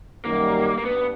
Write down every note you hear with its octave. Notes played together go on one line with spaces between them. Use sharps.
F#2 D#3 G3 A#3
A#3
G2 B3